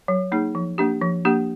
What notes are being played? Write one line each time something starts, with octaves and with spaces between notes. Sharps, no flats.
F#3
A#3 D#4 G#4
F3
A#3 D4 G4
F3
A#3 D4 G4